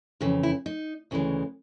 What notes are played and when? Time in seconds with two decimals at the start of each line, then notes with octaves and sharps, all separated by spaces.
0.21 F2 C#3 E3
0.43 E4
0.66 D#4
1.11 D2 C#3 E3 G#3